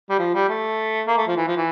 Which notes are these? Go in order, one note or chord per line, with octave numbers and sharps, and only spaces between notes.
G3
F3
G3
A3
A#3
A3
F3
E3
F3
E3